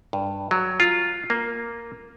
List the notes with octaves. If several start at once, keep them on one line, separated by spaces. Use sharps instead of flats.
G2
F#3
F4
A#3